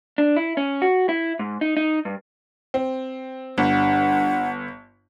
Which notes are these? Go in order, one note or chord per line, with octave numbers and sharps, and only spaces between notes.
D4
E4
C#4
F#4
E4
G#2
D#4
D#4
G2
C4
G1 G2 F#5